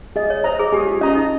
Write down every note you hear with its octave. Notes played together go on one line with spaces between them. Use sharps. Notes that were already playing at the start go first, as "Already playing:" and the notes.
G#4 D#5
C#5
C5 D#5 A#5
G#4
G4 G#4
F4
C#4 D#5 A#5
D#4